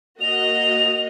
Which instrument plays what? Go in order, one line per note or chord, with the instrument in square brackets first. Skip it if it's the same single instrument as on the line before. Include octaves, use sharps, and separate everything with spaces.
[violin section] A#3 F#4 D#5 [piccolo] F7